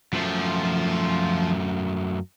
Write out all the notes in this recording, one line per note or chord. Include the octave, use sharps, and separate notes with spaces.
F#2 F3 A3